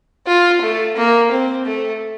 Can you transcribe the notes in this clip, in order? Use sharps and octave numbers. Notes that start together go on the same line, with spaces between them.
F4
A3
A#3
C4
A3